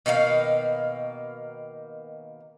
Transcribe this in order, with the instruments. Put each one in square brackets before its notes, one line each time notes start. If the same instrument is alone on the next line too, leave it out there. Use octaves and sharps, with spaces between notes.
[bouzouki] B2 D#3 A#3 F5